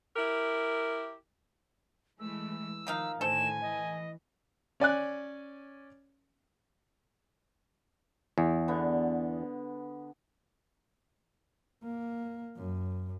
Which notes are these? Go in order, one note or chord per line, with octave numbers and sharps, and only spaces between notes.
E4 G4 A#4
E3 G#3 A3 E6
D#3 F3 A#3 D#4 F5
A2 D3 D#3 A4 C5 G#5 E7
E3 D#5
C#4 D5 G#5 F#6
E2
D3 B3
A#3
F#2